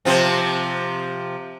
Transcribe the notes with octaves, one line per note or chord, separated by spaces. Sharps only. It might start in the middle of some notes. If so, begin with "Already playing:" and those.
C3 F3 C4